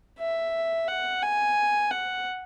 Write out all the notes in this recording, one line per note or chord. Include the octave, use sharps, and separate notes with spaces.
E5
F#5
G#5
F#5